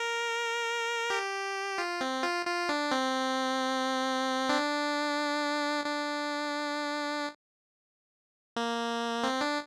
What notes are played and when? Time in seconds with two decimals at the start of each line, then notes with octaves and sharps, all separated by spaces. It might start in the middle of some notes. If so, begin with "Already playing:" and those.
Already playing: A#4
1.10 G4
1.78 F4
2.01 C4
2.23 F4
2.46 F4
2.69 D4
2.91 C4
4.49 D4
5.85 D4
8.56 A#3
9.24 C4
9.41 D4